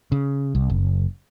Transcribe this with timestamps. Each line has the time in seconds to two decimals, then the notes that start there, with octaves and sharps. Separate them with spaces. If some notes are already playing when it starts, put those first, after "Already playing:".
0.12 C#3
0.55 C2
0.70 F#1